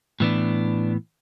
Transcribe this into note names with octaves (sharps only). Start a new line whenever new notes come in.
A2 E3 B3 D4